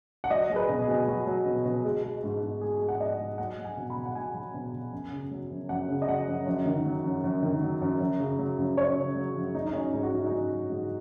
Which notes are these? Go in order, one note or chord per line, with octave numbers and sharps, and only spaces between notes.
F#5
F#3 D#5
F#3 G#4
B4
B2
G#4
B2
F#3 F#4
F#3
B2
B2
G#3
G#3
G#2
G#2
G#3 G#4
G#3
F#5
G#2 D#5
G#2
F#3 F#5
F#3
G#5
B2
B5
B2
F#5
F#3 G#5
F#3
B2
B2
F#2
C#3
F#3
F#2
F#2 F#5
C#3
D#5
F#3 F#5
F#2
F#2
D#3
F#3
F#2
F#2
D#3
F#3
F#2
F#2
C#3
F#3
F#2
F#2 C#5
C#3
F#3
F#2
F#3 D#4
D#4
F#3 C#4
G#2 D#4
F#4
G#2 D#4
D#4
F#3 C#4
F#3
G#2